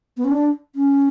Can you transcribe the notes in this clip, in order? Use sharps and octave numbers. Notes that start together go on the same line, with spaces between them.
B3
C#4
D4
C#4